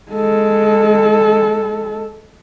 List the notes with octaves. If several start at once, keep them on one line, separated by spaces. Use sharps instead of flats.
G#3 A4